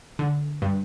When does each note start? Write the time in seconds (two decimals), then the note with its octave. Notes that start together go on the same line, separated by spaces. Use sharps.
0.19 D3
0.62 G2